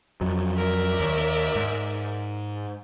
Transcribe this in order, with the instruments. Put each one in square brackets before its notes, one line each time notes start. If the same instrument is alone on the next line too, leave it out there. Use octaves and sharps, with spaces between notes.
[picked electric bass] F2 F#3
[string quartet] A#4 D5 E5
[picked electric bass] D#2
G#2